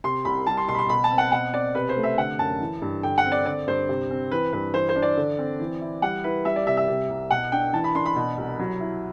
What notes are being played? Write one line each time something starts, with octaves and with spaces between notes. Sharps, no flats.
C3 C6
C2 B5
G3 A5
C6
B2 C6
B5
C6
B2 B5
A5
C4
F#5
B2 F#5
C4 D5
C3 B4
C5
A3
E5
D3 F#5
F#2 A5
E3
G2
D3 G5
F#5
C4
D5
D3 D5
G2 C5
C3
C4
E3 B4
G2 B4
E3 C5
C5
D4
D5
D3
C4
E3
E4
G3 F#5
E4 B4
G3 E5
D5
C3 E5
E5
C3
C2
B2 F#5
D4 G5
E3 A5
B5
D4 C6
B5
B2
C2
F#3
E4